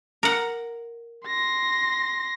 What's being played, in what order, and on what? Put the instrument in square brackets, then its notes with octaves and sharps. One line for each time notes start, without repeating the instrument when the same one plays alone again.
[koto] A#4 F#5
[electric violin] C6 A#6